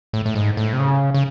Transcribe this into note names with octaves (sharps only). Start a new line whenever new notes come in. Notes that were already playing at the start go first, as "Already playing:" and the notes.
A2
A2
G#2
A2
C3
C#3
C#3